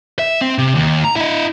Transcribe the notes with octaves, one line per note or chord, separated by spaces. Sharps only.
E5
C4
C3
D#2
A#5
E4 D#5